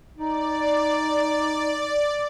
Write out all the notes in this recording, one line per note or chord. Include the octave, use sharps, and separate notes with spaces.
D#4 D5